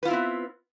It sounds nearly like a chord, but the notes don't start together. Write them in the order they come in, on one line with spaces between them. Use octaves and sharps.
B4 F4 E4 C4 B3